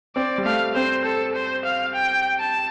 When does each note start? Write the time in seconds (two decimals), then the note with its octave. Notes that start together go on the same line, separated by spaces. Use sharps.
0.16 C4 D5
0.38 G3
0.45 A3 F5
0.75 C4 C5
1.05 A4
1.35 C5
1.65 F5
1.95 G5
2.40 A5